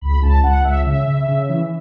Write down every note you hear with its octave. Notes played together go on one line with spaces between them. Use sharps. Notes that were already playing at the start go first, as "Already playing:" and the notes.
C#2 B5
C#2 A5
C#2 F#5
C#2 E5
C#3 E5
C#3
C#3
E3